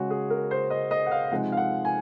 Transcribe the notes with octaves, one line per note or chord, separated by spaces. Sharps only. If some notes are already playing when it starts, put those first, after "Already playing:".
Already playing: C#3 G#3 C#4 F#4
G#4
A#4
C5
D#5
D#5
F#5
F5
C3 F3 G#3 D#4 F#5
F5
F#5
G#5